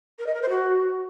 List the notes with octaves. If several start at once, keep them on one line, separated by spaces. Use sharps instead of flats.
A#4
D#5
A#4
C5
F#4